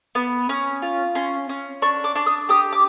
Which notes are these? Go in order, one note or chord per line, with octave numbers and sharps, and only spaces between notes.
B3
C#4
F4
C#4 C6
C#4
D4 C#6
D6
D4
D#6
G4 D#6
D6